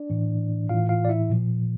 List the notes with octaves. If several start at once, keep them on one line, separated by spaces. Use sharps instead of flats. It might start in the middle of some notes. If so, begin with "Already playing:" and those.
Already playing: D4 D5
A2 E3
A2 E3 F4 F5
F4 F5
D5
E4 E5
A#2 F3